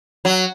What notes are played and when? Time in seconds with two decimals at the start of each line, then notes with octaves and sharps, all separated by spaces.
0.25 F#3